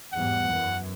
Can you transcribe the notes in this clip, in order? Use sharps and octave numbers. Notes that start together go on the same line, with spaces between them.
E2 G#2 G3 F#5
F#2 E3